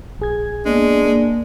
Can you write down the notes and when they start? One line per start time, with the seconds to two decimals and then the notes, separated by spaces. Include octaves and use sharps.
0.20 A#1 G#4 G#6
0.66 G#3 A#3 B3 D4
1.06 A#3